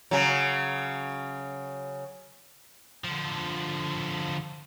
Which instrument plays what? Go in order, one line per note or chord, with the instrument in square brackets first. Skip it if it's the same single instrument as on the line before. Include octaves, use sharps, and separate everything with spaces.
[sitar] C#3 F#3
[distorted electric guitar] D3 F3